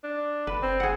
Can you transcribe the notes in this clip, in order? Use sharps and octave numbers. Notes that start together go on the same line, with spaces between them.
D4
F#1 B4
C4
G#4 F#5